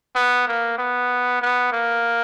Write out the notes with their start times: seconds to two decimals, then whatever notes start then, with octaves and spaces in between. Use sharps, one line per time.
0.16 B3
0.48 A#3
0.78 B3
1.42 B3
1.73 A#3